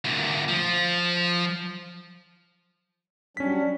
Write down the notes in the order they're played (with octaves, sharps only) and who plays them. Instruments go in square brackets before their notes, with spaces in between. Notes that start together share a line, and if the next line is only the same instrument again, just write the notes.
[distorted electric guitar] D2 A#2
F3
[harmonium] F#3 G3 D4 [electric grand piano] C#4 B6